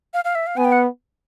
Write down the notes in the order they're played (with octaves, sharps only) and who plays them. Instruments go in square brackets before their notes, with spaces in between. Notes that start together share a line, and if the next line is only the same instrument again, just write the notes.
[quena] F5
F5
E5
F5
[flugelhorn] B3 [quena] G#5
[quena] G5
F#5